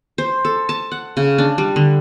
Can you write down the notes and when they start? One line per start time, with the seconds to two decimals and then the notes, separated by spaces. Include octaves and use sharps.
0.18 C5
0.45 A4
0.69 A5
0.92 F#5
1.17 C#3
1.38 D4
1.58 G3
1.76 D3